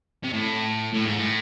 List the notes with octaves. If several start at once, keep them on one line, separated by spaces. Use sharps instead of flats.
C3
A2
A2
G#2
A2